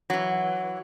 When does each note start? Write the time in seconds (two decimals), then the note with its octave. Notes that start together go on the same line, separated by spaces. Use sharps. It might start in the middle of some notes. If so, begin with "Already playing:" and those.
0.10 E3 F#3